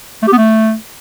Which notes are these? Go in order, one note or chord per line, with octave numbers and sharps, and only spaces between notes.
A3
G4
B3
A3